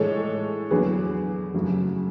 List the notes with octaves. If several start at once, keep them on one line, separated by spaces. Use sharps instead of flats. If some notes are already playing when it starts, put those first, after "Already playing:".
Already playing: A2 E3 G#3 A4 C#5
E2 D3 F#3 G#4 B4
F#2 C#3 F#3 A3